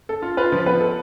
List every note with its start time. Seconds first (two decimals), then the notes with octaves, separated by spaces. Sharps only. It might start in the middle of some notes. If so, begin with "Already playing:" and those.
0.09 A4
0.22 F4
0.37 F4 B4
0.52 F3
0.66 B3 B4
0.80 A4